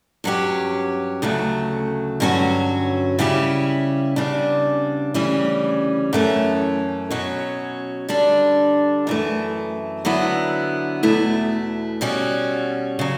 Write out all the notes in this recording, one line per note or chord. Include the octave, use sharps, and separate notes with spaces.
G2 F#3 C#4 G4
D2 C#3 F#3 A3
G2 D3 F#3 C#4 F#4
C#3 G3 C#4 E4 G4
E2 C#3 G3 D4
D2 C#3 E3 G3 C#4
F#2 E3 A3 C#4
B2 F#3 C#4
D3 G3 D4
F#2 E3 A3
D3 F#3 B3 E4
E2 B2 A3 E4
B2 G3 C#4 F#4
C#3 F#3